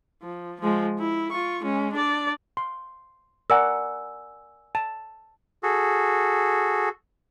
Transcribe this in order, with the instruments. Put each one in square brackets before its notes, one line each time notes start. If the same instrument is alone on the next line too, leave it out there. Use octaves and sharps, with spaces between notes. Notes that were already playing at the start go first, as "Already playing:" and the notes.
[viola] F3
F3 G#3
E4
F4 C#6
G#3 C#4
D4 D5
[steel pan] C6
[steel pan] A#4 D5 F#5 [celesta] G#5 E6
[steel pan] A5
[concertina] F#4 G#4 A4